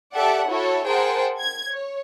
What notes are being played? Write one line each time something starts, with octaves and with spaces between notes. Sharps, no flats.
G4 A4 D5 E5 F#5
E4 F#4 A4 C#5
G#4 A#4 C5 F#5 G5 A5
G#6
C#5